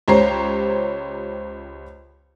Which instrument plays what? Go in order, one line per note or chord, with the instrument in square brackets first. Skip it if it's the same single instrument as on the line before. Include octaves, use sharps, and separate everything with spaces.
[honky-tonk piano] C#2 G4 C5 C#5 A#5 C7